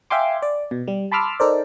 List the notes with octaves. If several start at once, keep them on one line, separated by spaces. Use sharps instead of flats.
E5 F5 G5 G#5 C6 D6
D5
B2
G3
A5 B5 C6 D6 E6 F6
D#4 A4 A#4 C5 D5